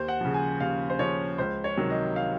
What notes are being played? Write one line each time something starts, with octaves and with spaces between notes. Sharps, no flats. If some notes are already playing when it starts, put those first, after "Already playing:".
Already playing: D#2 C5
F#5
C#3 F3
G#5
D#2 F5
C5
C#3 F3 C#5
C#2 C5
C#5
C3 D#3 F#3
D#5
F5